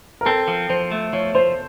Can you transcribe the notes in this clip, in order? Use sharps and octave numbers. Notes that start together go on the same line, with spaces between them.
A#4
C4 A4
F3
F3 C5
A3
F3 C#5
F3 C5